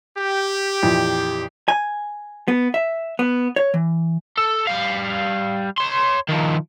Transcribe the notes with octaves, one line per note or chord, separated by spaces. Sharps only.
G4
F2 A#2 E3
G#5
B3
E5
B3
C#5
E3
A4
G3 F5
C#5 C6
D#3 F3